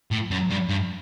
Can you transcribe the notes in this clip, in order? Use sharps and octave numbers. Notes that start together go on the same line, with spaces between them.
A2
F#2
G2
G2